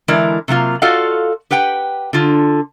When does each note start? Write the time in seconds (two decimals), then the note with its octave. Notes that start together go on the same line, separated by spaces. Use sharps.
0.08 D3 E3 G#3 E4 A#4 D5
0.48 C3 F#3 A#3 F4
0.82 F4 F#4 A4 D5 D#5 F5
1.51 G4 B4 F#5 G5
2.13 D3 F4